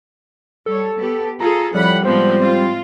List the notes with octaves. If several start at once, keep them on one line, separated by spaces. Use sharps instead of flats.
G3 A4 C#5
B3 G4
F4 G#4 A4 A#5
F2 A2 F3 G3 F#5 B5
A2 F3 G#3 B3 C4 C5
G3 F4